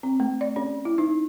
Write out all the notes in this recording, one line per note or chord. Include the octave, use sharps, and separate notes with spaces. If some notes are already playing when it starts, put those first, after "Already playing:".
C4
A3
D5
C#4
E4
D#4